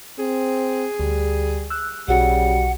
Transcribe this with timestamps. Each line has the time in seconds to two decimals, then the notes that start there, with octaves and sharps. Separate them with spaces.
0.19 C4 G#4
1.00 D2 G3
1.70 E6 F#6
2.08 B1 C#3 G3 F#4 F#5